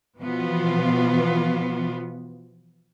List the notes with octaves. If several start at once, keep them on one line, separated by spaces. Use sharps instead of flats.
B2 E3 F3 B3 F4